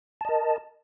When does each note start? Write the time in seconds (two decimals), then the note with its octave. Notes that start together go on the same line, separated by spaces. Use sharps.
0.21 A5
0.25 D#5
0.29 A#4